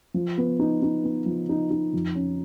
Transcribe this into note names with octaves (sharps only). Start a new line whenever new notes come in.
F3
B3
D#4
D#4
B3
F3
D#4
D#4
F2
C#4